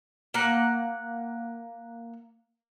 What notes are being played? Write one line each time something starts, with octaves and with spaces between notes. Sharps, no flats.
A#3 F#5